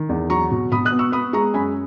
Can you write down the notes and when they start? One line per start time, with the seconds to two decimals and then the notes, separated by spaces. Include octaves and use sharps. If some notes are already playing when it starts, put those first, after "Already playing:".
Already playing: D#3
0.09 E2
0.30 F#3 A#5 C#6
0.51 B2
0.72 B2 B5 D#6
0.85 D#6 F#6
0.92 B3
0.99 C#6 E6
1.12 B3 B5 D#6
1.33 G#3 A#5 C#6
1.54 F#2 G#5 B5